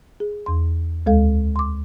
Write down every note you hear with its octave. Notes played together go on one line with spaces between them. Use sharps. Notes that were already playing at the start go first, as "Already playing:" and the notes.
G#4
E2 C6
D2 G#3 A4 F5
C6 D6